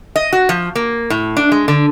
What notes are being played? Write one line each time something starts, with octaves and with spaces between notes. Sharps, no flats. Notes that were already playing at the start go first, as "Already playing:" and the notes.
D#5
F#4
F3
A#3
A2
D4
G#3
D3